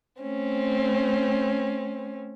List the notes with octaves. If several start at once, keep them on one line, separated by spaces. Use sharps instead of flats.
A3 C4 C#4